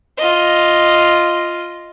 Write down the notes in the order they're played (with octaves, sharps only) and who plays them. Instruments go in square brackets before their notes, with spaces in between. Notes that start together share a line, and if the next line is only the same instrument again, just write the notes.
[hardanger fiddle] F4 D#5